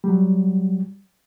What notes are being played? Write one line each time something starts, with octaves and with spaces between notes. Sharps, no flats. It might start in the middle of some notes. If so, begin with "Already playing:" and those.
F#3 G3